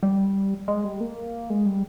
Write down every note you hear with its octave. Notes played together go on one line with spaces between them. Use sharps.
G3
G#3
G3
A#3
G#3
G3